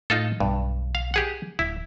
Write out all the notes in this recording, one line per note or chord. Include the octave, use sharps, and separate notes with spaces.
A2 D#4 F4 A4
B1 G2
F5
G4 G#4 F#5
D1 E4